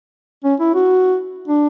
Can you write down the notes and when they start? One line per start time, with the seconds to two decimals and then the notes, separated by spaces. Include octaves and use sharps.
0.44 C#4
0.60 E4
0.75 F#4
1.48 D4